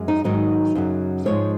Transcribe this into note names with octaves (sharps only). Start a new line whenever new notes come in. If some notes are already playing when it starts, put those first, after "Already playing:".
Already playing: F#2 G#3
D#4
G#2 D#3 F#3 D#4
F#2 C#3 F#3
G#2 F3 G#3 C#5